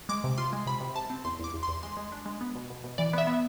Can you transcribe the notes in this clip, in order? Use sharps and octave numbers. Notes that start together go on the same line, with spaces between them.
G#3 D6
C3
F4 C6
G#3
C3 B5
C3
C3 A5
C4
E2 C6
E2 D6
E2
C6
E2
G#3 C6
G#3
D4
G#3
B3
B2
B2
B2
E3 D5
B3 E5
B3